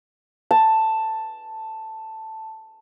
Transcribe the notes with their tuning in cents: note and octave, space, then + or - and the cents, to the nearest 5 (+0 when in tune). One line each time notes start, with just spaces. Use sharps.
A5 +5